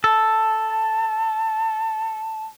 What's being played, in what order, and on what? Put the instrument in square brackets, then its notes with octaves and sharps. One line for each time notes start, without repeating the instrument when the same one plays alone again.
[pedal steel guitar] A4 [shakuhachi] A5